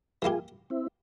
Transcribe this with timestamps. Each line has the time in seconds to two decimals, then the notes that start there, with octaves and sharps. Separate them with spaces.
0.22 E3 A#3 E4 F4 G4 G#4
0.70 C4 E4